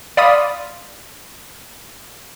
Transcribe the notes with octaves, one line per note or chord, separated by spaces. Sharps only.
D5 F5 B5 C6 D#6